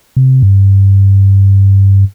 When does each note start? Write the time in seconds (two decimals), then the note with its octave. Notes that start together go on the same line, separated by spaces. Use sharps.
0.17 C3
0.42 G2